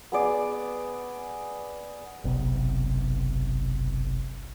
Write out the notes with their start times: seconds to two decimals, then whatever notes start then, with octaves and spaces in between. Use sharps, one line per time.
0.12 B3 G#4 D5
2.24 F#1 B1 C3